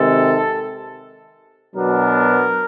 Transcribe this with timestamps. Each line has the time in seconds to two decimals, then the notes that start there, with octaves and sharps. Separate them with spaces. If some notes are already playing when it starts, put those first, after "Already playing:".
Already playing: C3 D#3 G#3 A4
1.75 B2 F#3 B3 D4 A#4